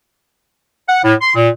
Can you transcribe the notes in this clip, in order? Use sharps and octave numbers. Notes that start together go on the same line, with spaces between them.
F#5
A2
C6
A#2